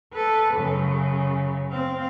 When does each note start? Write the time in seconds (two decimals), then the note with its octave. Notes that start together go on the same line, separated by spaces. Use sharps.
0.13 A4 B4
0.55 F#2 C#3
1.71 C4 F5